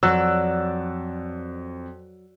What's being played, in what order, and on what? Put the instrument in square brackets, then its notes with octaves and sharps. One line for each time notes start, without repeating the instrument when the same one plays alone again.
[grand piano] F2 [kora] F#3 [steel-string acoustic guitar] D5 [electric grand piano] E6 F#6